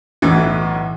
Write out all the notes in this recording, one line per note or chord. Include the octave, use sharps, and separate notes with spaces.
B1 A2 E3